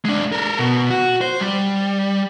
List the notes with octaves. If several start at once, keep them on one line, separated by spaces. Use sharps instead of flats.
G#3 D4
A4 A#4
B2
F#4
C5
G3